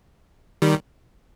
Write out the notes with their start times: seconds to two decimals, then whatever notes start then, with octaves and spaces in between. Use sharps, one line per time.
0.62 D#3 G3